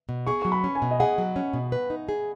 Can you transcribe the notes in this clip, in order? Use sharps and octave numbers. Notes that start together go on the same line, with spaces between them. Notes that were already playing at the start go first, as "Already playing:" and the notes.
B2
G#4 C#6
F#3 C#6
B5
C#4
G#5
B2
D#5
G#4 F#5
F#3
C#4
B2
B4
D#4
G#4